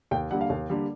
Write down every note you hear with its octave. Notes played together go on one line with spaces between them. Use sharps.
D#2 G5
D3 G3 A#3 F#5
F5
D#2
D3 G3 A#3